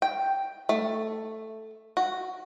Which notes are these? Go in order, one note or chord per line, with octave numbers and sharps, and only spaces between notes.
G5
A3
F#4